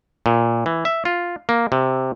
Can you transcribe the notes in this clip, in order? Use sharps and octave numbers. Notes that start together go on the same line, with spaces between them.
A#2
E3
E5
F4
A#3
C3